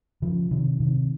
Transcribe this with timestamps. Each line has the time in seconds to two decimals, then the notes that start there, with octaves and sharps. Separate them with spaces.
0.22 C#3 F3
0.51 C3 D#3
0.80 C3 D#3